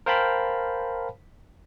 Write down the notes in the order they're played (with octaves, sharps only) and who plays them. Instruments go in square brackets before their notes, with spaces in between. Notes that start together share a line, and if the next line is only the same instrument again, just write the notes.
[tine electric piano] A#4 C5 F5 G5 A5 B5